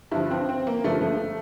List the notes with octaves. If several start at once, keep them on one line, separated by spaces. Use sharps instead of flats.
G2 D3 F3 E4
C4
C4
A#3
G2 D3 F3 A3
A3